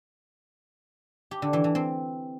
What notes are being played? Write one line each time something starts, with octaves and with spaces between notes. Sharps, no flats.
G4
D3
E3
E3
C4